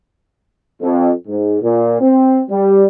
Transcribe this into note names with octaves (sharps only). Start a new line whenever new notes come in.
F2
G#2
A#2
C4
G3